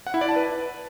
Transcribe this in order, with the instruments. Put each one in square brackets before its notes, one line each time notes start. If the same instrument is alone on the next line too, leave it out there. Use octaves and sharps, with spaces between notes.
[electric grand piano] F#5
E4
D5
A5
B4